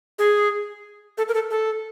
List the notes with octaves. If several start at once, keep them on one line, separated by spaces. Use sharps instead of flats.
G#4
A4
A#4
A4
A4